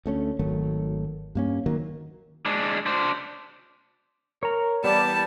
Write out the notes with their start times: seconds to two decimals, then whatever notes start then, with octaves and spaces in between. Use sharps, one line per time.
0.06 D2 A3 C#4
0.39 G#1 D#3 F#3 A3
1.35 G2 A#3 C#4
1.66 D#3 F#3 A#3
2.46 G#3 D4
2.86 D4 C5
4.43 A#4 C#5 A#5
4.84 E3 G3 B3 B4 D5 A5